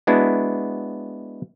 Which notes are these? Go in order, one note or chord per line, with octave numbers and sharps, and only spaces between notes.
G#3 B3 D4 E4 F#4